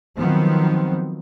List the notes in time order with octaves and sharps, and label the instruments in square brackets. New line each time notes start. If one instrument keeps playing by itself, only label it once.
[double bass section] D#3 F3 F#3 B3 C4